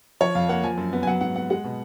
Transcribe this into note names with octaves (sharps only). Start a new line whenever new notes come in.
F3 C#5
F2 F5
A#3 F#5
F3 G#5
F#2
B3
G#5
F#3 F#5
G#2 F#5
B3 F#5
G#3 F#5
B2